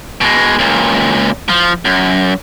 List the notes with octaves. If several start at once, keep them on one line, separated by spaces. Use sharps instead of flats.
B2 G#3
C#2 A#2
F3
F#2